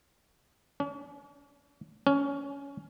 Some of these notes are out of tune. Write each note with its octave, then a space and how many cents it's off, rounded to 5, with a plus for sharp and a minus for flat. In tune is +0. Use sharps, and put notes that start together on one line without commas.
C#4 +45
C#4 +15